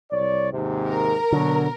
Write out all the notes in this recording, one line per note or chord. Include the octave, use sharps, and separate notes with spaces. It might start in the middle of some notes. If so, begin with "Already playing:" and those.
C2 C#5 D5
D#2 G#2 C3
A#4
B2 D3 F#3